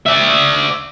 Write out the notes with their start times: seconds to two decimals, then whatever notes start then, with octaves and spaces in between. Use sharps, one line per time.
0.06 D5 E5